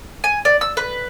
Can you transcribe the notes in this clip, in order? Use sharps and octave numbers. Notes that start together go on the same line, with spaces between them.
G#5
D5
E6
B4